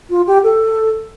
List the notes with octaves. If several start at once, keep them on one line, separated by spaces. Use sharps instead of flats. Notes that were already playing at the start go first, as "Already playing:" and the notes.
F4
G4
A4